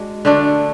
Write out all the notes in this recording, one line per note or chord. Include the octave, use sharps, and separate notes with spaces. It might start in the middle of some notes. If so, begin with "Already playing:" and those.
Already playing: G#3 D4 F#4
D3 A3 D4